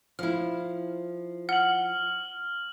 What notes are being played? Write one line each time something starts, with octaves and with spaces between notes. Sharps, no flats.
F3 E4 F6
F#5 F6 F#7